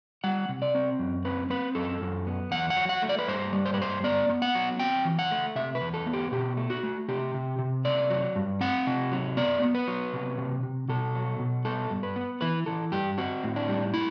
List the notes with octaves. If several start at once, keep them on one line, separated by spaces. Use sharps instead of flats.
G3 F#5
C3
D5
C4
F#2
C4 B4
C4 B4
F#2 A4
F#2
B3
E2 F#5
F#5
F#3
F#5
A3
D5
B4
G2 C5
G3
C5
B4
G2 C5
B3 D5
B3
F#5
F#3
C4 G5
E3
F#5
A3
C3 E5
B4
E2
A4
B3
G4
B2 G4
A3
F#4
A3
C3 G4
C3
C3
A3 D5
F#3
G2
C4 F#5
C3
F#3
B3 D5
B3
B4
F#3
C3
C3
C3
B2 A4
F#3
B2
B3 A4
G2
B4
B3
E3 B4
E3 A4
G2 G4
C4 F#4
A2
D4
G3
E4